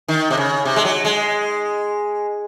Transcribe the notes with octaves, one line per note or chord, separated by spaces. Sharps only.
D#3
C3
C#3
C3
G#3
F#3
G#3